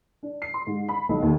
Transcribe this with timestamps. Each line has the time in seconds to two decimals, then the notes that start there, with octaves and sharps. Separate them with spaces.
0.23 D4
0.42 C7
0.54 C6
0.67 G#2
0.88 B5
1.09 B1
1.22 D#2